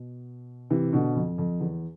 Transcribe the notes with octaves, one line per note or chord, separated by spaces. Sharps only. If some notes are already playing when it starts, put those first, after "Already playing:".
Already playing: B2
C3 E3
B2 D3
F2
F2
E2